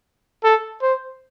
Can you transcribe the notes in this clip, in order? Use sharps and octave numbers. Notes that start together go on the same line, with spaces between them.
A4
C5